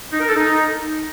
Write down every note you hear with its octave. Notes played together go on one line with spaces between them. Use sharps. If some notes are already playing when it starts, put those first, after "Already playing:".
D#4
A#4
A4
D#4